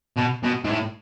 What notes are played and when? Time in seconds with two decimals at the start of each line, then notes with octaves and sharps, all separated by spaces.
0.17 B2
0.44 B2
0.64 G#2
0.70 A2